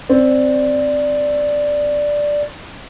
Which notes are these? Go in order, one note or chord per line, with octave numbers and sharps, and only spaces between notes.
C4 D5